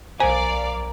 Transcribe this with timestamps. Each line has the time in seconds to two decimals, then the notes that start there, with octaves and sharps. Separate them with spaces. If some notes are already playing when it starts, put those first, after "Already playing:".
0.20 B1 A#4 C5 D5 F5 G#5 A#5